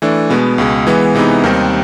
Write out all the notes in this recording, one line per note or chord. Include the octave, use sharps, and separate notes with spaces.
E3 A3 D4
B2 G#3 B3
C#2 B2 G#3
E3 G#3 B3
C3 E3 G#3 B3 D#4
D#2 D#3 G3 C4 D#4